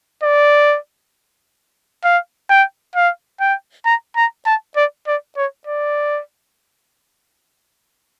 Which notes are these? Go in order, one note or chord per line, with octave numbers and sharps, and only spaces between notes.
D5
F5
G5
F5
G5
A#5
A#5
A5
D5
D5
C#5
D5